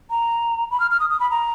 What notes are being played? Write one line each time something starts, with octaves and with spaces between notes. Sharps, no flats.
A#5
B5
F6
F6
D#6
D#6
B5
A#5